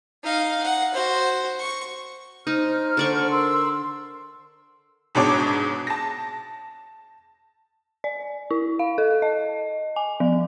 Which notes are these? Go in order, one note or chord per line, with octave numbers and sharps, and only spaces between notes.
D#4 F5
F#5
F#4 C5
C#6
D#4 C5 F6
D3 D5 C#6
A#4 C6 E6
G#2 B2 D4 C#5 D6
A5 A#6
D5
E4
F5
A4
D#5
G#5
F3